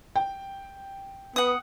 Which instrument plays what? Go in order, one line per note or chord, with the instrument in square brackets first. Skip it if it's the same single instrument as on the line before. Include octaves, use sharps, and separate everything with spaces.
[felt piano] G5
[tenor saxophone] B3 [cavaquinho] F#5 D#6